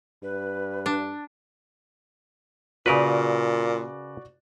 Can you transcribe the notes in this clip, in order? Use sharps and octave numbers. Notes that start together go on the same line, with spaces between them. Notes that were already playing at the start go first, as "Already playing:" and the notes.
G2 B4
D4
A#2 C#3 F#4 A#4 B4 D5